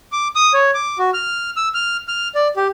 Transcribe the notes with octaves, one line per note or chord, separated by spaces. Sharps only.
D6
D#6
C#5
D6
F#4
F6
E6
F6
F6
D5
G4